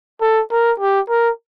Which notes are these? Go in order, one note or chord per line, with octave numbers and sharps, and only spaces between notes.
A4
A#4
G4
A#4